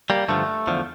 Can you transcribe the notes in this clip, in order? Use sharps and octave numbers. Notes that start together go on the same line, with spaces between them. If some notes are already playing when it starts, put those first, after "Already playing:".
G3 A#3
G2 D3 F3 A3
E2 D3 F3